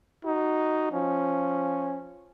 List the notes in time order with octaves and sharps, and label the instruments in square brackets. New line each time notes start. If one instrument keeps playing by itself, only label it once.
[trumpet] D#4 [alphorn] F#4
[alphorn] F3 [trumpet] C#4